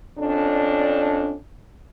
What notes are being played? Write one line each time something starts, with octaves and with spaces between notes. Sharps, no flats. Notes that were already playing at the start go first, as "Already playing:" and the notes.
F2 C#4 D4